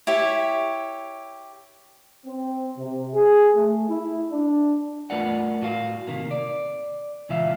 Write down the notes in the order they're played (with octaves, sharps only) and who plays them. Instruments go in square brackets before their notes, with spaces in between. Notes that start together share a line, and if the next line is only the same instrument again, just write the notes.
[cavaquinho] E4 G4 C#5
[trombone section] C4
C3
G#4
A3
E4
D4
[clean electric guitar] A3 F4 A#4 B4 D5 F#5
A2 F#4 F5
C3 D#3 A#3
D5
C#2 A#2 E3 F4 E5 F5